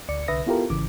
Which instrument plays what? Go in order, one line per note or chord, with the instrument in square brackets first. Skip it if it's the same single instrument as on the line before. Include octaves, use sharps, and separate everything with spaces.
[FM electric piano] D2 D5 C#7
C2 D3 B4 E5 D#6 A#6
B3 E4 F4 G4 A4 A#4
G#1 C#3 E3 D6